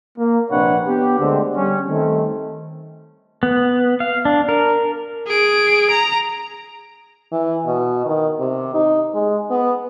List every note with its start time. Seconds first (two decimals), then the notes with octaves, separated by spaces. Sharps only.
0.18 A#3
0.50 A#1 C3 D4 B4 C#5 F#5
0.88 B3 G4
1.19 D2 D3 G#3 C4
1.56 G3 C#4
1.88 D#3 A3 C4
3.43 B3
4.00 F5
4.25 D4
4.49 A#4
5.27 G#4 D7
5.91 A#5
7.32 E3
7.66 B2
8.06 D#3
8.39 C3
8.74 D#4
9.14 G#3
9.51 B3